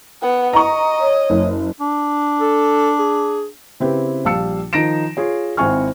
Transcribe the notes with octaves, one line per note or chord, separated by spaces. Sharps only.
B3 F#5
D#5 A#5 C#6
C#5
F#1
D4
A4
G#4
C#3 C4 E4 G4 B4
A#1 G3 F5 A5 E6 C#7
D#3 F3 D#4 A#6 D7 E7
F4 G#4 C#5
G#1 C4 E4 G#5 C#6 F6